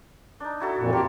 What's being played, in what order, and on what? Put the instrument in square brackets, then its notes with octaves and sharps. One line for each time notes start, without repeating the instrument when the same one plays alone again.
[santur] D4 D#4
E4 F#4 A4
[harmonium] F2 A#2
[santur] A#3 C4 [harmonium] G4